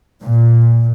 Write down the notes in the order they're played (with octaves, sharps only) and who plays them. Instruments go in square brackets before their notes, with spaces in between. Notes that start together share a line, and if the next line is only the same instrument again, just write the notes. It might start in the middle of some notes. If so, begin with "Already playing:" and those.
[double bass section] A#2